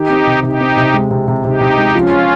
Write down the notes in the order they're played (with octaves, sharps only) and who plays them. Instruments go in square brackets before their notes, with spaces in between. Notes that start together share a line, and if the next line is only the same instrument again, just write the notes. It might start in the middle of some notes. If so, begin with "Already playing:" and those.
Already playing: [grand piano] D#3 [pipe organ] D#4 G4
[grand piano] C4
C3
[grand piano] C3 [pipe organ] D#4 G4
[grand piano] C4
C3
G#3
C3
C3
[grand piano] C3 [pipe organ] D#4 G4
[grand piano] C3
G#3
[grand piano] F3 [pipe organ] C#4 F4
[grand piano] F3